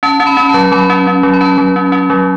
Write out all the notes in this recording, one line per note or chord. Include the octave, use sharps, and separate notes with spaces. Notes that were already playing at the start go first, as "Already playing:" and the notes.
C#4 A5
C#4
B5
C#4
F#3 A5
F#3 B5
C#4
C#4
F#3
B5
C#4 A5
F#3
C#4
C#4
F#3